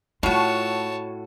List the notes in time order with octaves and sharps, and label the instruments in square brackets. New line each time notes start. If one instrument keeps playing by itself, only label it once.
[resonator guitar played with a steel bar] A2 F#4 [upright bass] A3 F4 [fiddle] C#5 A5